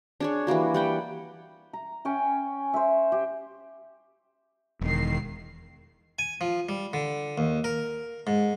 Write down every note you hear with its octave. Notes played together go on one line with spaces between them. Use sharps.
D4 G#4 C#5
E3 G3 A#3 F#4
G3 F#5 G5
A#5
C#4 G5 G#5
C5 C#5 E5
G4
E1 D#3 C7
G#5
F3
G3
D3
D#2
A#4
G#2